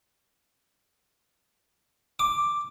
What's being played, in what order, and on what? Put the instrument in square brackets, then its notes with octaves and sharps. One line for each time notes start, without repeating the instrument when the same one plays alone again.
[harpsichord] D6